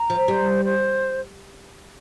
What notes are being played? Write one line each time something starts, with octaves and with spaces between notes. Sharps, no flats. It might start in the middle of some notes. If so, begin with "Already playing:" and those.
Already playing: A#5
F3
G3 C5
C5